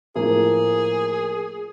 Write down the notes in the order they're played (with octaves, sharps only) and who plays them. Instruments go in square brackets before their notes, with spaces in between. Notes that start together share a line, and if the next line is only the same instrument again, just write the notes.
[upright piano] A2 F3 A#3 [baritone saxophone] G#4